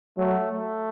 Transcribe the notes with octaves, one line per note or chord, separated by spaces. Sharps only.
F#3 A3
A3